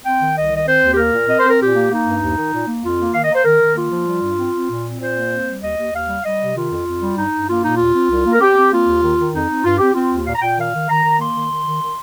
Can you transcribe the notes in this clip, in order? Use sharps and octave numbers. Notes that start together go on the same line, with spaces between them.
C4 G5
D#3
C2 D#5
D#3 D#5
C4 C5
D#2
G4
A#3 A#4
A#2
C4 D#5
C5
C4
A#4
A#2 G4
A#3
A#3 D#4
G2
D#2
D#3
A#2
A#3
F2 F4
A#3
D#3 F5
D#5
A#3
C5
D#3 A#4
D#3
A#3 F4
F3
G3
G2
C4
C4
A#2
C4
A#2 C5
A#3
C4
G3
D#2 D#5
D#2
D#2 F5
G3
G3 D#5
C3
D#3 F4
F2
F2
G3
G2 D#4
G2
A#3 F4
A#2 D#4
D#2 F4
C4
C2
A#3
A#4
C4 G4
C4
A#3 F4
D#2
D#3
D#3
F2 D#4
C4
G2 F4
C4 G4
C4 F4
D#2
A#2 F5
A#5
A#2 G5
D#3 F5
D#3
D#3 A#5
D#3
A#3 C6
D#3
D#3
D#3
D#3